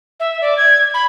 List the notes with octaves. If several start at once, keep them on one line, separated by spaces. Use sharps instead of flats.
E5
D5
G#6
B5